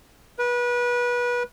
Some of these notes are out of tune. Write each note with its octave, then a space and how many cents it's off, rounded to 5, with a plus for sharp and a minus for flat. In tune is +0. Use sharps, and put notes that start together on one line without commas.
B4 -25